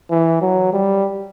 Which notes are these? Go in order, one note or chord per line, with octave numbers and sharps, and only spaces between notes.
E3
F#3
G3